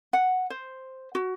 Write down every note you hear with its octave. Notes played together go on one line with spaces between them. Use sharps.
F#5
C5
F#4